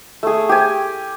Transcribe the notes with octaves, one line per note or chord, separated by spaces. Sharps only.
A3 G#4
G4 G#5